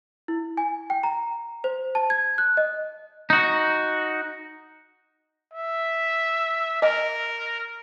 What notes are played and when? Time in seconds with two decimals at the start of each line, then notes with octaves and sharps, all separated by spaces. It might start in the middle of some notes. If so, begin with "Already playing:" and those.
0.28 E4
0.57 G#5
0.90 G5
1.03 A#5
1.64 C5
1.95 A5
2.10 G#6
2.38 F#6
2.57 D#5
3.30 D#4 F#4
5.53 E5
6.82 A#4 D#5